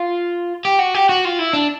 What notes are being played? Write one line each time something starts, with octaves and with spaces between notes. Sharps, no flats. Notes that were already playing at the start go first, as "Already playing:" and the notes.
Already playing: F4
G4
F#4
G4
F#4
F4
E4
D4